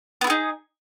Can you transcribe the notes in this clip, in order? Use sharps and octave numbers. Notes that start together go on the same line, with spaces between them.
B3 D#4 E4 G#4